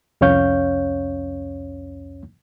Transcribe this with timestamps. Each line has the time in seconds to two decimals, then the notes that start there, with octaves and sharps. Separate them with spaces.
0.21 C2 F2 C#4 C#5 F5 G6